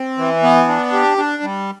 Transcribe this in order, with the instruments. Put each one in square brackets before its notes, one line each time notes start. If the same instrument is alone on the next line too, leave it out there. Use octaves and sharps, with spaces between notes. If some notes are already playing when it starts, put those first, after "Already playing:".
Already playing: [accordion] C4
E3
B3
D4
G4
D4
G3